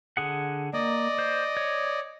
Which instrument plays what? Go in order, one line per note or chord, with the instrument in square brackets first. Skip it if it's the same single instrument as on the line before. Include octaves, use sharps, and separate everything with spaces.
[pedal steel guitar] D3 G#4 F#5
[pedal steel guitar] A#3 [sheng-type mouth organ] D5 D#5
[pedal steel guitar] C5
C#5